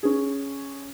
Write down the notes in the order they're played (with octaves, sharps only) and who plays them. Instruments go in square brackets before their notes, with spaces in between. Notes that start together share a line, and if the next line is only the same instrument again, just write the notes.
[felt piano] C#4 G#4